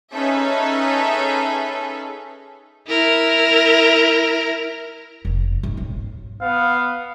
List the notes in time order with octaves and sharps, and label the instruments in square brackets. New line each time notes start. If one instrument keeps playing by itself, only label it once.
[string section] C#4 D#4 G#4 A4 B4 E5
[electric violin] E4 A#4
[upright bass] F1
G#1
B1
[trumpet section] B3 F5